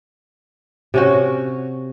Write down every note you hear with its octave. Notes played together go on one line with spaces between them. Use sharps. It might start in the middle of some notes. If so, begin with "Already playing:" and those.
C3 C#4 F#4